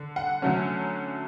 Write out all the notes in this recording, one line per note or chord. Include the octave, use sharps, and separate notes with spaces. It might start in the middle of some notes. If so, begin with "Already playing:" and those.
Already playing: D3
F#5
D3 F#3 A3 C#4